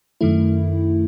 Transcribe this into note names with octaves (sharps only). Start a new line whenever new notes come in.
F#2 D#3 A3 E4